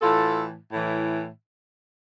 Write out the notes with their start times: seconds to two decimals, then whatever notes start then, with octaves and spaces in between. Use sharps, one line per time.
0.01 A2 E3 F4 A4
0.72 A2 E3